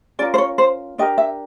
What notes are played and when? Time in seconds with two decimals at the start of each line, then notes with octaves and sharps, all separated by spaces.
0.19 C#4 F4 A#4 D5
0.34 C5
0.38 C#5
0.58 C5
0.98 D4 G4 A#4 D#5
1.18 E5